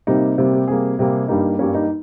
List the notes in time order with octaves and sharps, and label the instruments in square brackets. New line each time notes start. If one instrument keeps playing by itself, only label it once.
[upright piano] C3 G3 A#3 D#4
C3 G3 A#3
G4
C3 G3 A#3 G#4
C3 G3 A#3
G2 G3 A#3 D#4
G2 G3 A#3 C#4
D#4